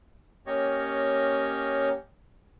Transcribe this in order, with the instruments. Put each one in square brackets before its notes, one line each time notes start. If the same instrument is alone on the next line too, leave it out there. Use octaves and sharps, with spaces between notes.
[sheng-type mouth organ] A#3 C#4 G4 C#5 D#5